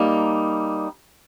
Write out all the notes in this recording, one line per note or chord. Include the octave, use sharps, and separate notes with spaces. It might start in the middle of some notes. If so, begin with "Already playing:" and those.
Already playing: G3 A#3 D#4